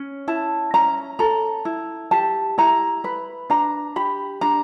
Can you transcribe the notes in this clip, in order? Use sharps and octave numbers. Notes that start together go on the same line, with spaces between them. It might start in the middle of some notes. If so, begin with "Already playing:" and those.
Already playing: C#4
E4 A5
C#4 A#5
A4 A#5
E4
G4 A5
E4 A#5
B4 B5
D4 A#5
G4 B5
D4 A#5